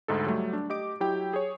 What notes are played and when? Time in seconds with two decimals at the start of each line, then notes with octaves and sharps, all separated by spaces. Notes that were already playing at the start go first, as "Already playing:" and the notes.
0.08 D2 G#2 D#4 A4
0.26 F#3 G3 A3
0.53 D4
0.70 G4 D#5 D6 D7
1.00 F#3 E4 G4 G5
1.33 G#4 C#5